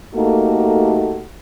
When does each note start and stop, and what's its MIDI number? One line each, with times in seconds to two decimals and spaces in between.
0.15 1.24 57
0.15 1.24 58
0.15 1.24 63
0.15 1.24 66
0.15 1.24 67
0.15 1.24 69